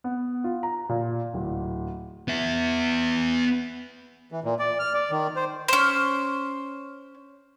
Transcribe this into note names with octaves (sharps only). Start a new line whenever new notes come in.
B3
F4
A#5
A#2
D1
B3 E5
E3
A#2
D5
F6
D5
D#3
C5
C#4 C5